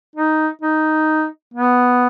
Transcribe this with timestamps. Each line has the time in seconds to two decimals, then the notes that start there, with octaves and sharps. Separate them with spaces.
0.16 D#4
0.61 D#4
1.54 B3